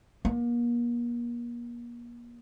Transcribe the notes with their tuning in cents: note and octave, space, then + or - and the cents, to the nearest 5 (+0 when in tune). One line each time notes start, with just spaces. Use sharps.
A#3 +40